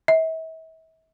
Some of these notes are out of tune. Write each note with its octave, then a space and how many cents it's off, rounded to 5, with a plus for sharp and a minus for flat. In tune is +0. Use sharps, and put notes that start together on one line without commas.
E5 -40